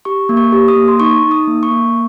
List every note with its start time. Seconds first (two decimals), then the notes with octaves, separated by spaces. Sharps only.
0.05 G4 C#6
0.29 A#3
0.37 C#6
0.52 G4
0.68 D#6
0.76 A#3
0.88 C6
1.00 D#4 C#6
1.23 D#4
1.31 D#6
1.47 A#3
1.63 C#6
1.71 A#3